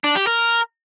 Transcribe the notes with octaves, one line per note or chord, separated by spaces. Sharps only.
D4
G4
A#4